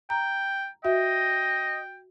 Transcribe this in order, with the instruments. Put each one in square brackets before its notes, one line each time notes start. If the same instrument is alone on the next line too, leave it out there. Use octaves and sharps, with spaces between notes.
[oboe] G5 [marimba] A#5
[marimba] F#4 E5 [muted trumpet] D#5 [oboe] G5